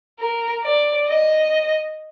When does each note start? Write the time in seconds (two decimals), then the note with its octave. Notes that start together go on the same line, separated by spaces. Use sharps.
0.20 A#4
0.64 D5
1.08 D#5